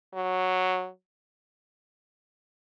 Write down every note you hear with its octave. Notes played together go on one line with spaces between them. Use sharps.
F#3